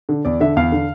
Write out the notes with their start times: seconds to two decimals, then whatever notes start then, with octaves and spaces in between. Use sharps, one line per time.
0.09 D3
0.25 E2 D5
0.40 D3 E5
0.56 E2 F5
0.72 D3